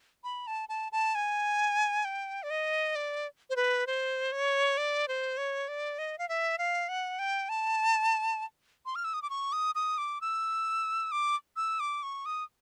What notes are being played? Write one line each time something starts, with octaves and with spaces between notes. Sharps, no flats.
B5
A5
A5
A5
G#5
G5
D5
D#5
D5
C5
B4
C5
C#5
D5
C5
C#5
D5
D#5
F5
E5
F5
F#5
G5
A5
C6
F6
E6
D#6
D6
C#6
D#6
D#6
D6
E6
D6
E6
D6
C#6
D#6